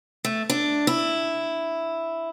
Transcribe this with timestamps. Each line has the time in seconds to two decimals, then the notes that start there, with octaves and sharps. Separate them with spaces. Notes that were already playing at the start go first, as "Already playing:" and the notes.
0.25 A3
0.50 D4
0.87 E4